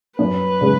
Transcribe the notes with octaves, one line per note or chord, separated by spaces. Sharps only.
F#2 B4
C#3 G#3